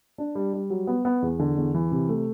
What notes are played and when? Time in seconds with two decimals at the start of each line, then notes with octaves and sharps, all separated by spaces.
0.18 D4
0.35 G3
0.53 G3
0.70 F#3
0.87 B3
1.05 B3
1.22 E2
1.39 D3
1.57 E2
1.74 E3
1.92 C3
2.09 A3